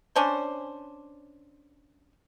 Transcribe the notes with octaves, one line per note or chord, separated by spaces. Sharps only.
C#4 D4 C5